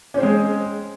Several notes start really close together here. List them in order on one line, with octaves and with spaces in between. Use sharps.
C#4 C4 C5 G#3 G#4